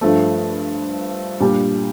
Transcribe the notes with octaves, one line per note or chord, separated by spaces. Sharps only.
G2 F3 A3
A#2 G3 D4 G4